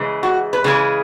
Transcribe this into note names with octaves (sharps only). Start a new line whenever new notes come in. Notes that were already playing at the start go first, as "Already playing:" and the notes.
Already playing: C#3 E3 G#3
F#4
B4
C#3 E3 G#3 G#4